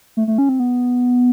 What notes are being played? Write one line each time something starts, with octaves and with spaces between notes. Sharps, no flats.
A3
A3
C#4
C4
B3